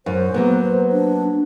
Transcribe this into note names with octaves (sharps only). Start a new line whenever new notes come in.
F#2 C5
F#3 A#3 B3
D4